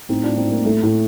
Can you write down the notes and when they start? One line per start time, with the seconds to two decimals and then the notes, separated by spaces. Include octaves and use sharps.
0.09 A2 C4 D#4
0.23 A2 D4 F4
0.37 C4 D#4
0.46 A2
0.51 A#3
0.65 A2 A3
0.83 A2